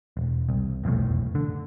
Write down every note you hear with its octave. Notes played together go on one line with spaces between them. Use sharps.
E1
C2
F1 B1 E2 A2
D3